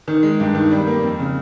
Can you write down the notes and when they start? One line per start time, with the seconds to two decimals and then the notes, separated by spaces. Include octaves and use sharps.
0.08 D#3
0.23 G#3
0.40 G2
0.55 D#3
0.71 G3
0.87 A#3
1.03 F2
1.19 C#3